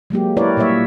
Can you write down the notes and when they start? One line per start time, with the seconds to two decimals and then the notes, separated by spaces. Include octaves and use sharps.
0.10 F#3 G#3 A#3 G4
0.37 E4 A#4 B4 C#5 D5
0.57 A#2 G3 A#3 C#5 E5